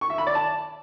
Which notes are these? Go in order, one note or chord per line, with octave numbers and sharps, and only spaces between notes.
C#6
E5
B5
D5
A5